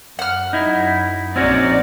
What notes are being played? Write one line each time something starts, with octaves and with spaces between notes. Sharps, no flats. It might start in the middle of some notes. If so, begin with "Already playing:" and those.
F#2 F#5 F6
D#4 E4
A#1 C4 C#4 D#4 F#4 D5